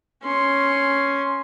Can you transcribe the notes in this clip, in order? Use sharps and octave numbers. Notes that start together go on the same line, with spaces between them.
C#4 C6